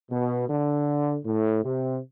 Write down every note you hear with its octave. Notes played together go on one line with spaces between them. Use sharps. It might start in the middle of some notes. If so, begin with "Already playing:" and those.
B2
D3
A2
C3